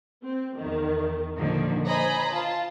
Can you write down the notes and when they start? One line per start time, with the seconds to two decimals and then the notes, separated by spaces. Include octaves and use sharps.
0.23 C4
0.57 E2 D#3
1.37 A#2 D3 D#3 F3
1.86 C5 C#5 D#5 G#5 A#5 B5
2.31 F4 A5